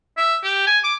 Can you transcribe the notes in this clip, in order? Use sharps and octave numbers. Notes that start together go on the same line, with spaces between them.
E5
G4
G#5
D6